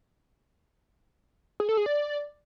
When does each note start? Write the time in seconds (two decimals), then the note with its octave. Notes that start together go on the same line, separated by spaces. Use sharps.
1.60 G#4
1.69 A4
1.77 G#4
1.86 D5